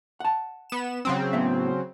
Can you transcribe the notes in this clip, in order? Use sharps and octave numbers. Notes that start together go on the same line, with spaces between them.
F#5 A5
B3 E7
C#3 F#3 C4
A2 B3 E5